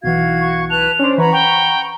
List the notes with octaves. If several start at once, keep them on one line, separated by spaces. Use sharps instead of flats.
B1 E3 F#4 F5 G#6
C#6
B4 A5 F#6 F7
C#4 D4 C5
E3 B4 C#5 F#5 A#5 B5
G5 C#6